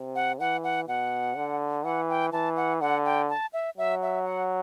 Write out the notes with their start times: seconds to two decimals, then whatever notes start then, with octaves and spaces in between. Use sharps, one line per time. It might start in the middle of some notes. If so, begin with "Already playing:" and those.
Already playing: C3
0.15 F#5
0.40 E3 F#5
0.64 F#5
0.87 B2 F#5
1.36 D3
1.84 E3 F#5
2.09 G5
2.32 E3 A5
2.56 F#5
2.81 D3 F#5
3.05 G5
3.29 A5
3.53 E5
3.78 F#3 E5
4.02 E5
4.25 F#5